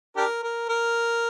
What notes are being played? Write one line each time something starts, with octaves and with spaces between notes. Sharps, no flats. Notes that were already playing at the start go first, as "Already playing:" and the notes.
D4 G4 A#4
A#4
A#4